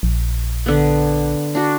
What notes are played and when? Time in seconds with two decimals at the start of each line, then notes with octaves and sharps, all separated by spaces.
0.03 A#1
0.66 D3 B3
1.55 D4 F#4